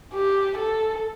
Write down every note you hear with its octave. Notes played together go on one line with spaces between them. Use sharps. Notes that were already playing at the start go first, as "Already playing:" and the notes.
G4
A4